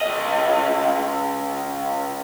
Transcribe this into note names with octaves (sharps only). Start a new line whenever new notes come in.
C#2 D#5